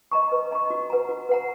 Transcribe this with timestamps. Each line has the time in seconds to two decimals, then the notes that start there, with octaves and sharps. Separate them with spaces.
0.12 D#5 A#5 C#6
0.32 B4
0.51 D#5 A#5 C#6
0.70 F#4
0.90 B4 F#5 A#5
1.09 F#4
1.29 B4 F#5 A#5